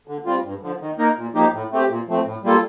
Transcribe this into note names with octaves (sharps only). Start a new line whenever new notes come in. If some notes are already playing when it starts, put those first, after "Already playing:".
D3
G3 C4 F4
G2
D3 F3
D#3
A#3 D#4 A#4
A#2
F3 A#3 D#4 G4
A2
A3 C4 G4
A#2
F3 A3 C4
A2
G3 A#3 F4 A4